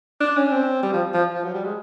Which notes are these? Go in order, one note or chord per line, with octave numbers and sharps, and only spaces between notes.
D4
C#4
C4
G3
F3
F3
F3
F#3
G3
G#3